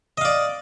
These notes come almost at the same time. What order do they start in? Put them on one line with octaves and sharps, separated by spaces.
D#5 F5 D5